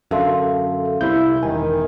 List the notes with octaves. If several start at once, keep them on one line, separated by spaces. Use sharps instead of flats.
F#2 D3 C#4 A4 E5 F5 C6
C2 C3 E4 G6
E1 D#3 G#5